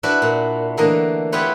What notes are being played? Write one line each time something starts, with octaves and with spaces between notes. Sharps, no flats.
D4 E4 F#4 B4 D5
A#2
D3 E3 A3 A#3 D#5
B3 E4 F4 G4 B4 C#5